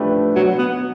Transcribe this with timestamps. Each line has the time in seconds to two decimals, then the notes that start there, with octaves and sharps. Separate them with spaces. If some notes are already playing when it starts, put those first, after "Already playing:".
Already playing: F3 A3 D4 G4 B4
0.36 B2 F#3
0.58 B3